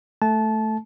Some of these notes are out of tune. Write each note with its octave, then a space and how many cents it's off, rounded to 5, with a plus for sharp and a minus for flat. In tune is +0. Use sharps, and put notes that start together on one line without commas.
A3 +0 A5 -20